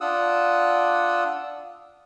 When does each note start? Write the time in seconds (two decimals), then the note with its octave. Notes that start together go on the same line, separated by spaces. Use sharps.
0.01 D4 F4 F#5 D#6 E6